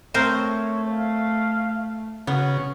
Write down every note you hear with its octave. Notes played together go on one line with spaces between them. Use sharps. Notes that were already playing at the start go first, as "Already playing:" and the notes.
A3 C4 A#4 C5 C#5
F5
C#3 B3 F#4 C#5